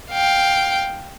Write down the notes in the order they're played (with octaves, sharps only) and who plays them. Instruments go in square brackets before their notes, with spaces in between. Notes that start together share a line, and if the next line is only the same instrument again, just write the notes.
[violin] F5 G5